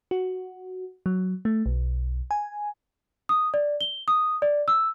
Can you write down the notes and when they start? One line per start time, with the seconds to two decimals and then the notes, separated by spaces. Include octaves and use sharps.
0.11 F#4
1.06 F#3
1.45 A3
1.66 B1
2.31 G#5
3.29 D#6
3.54 D5
3.81 G7
4.08 D#6
4.42 D5
4.68 E6